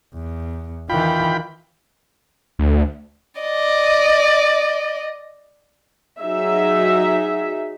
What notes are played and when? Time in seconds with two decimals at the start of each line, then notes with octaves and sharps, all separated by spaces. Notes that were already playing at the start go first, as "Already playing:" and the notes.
0.15 E2
0.89 D#3 E3 F4 G5 B5
2.59 D2
3.41 D5 D#5
6.19 F#3 D#4 G#4 E5